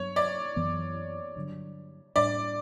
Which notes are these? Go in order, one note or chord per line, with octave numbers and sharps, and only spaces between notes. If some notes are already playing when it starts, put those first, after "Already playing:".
Already playing: G2 F#3 B3 D4 C#5
D5
F#2 E3 B3
G2 D3 F#3
A2 G3 D4 D5